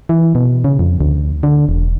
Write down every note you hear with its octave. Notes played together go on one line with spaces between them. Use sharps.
E3
B2
C#3
F2
D2
D3
E1